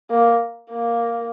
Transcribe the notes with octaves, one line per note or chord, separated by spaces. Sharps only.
A#3
A#3